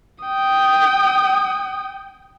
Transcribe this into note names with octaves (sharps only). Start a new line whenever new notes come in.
G5 D#6